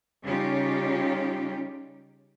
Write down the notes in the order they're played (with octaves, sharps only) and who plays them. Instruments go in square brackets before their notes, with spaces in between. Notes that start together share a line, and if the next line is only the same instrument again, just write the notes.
[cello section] C#3 G3 C#4 D#4 F4 G4